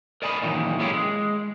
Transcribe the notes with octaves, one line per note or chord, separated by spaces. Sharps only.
A#4 D5 D#5 G#5 A#5 B5
A#2 D#3 E3 F#3
G#3 A#3 C#4 E4 F4 G4
G#3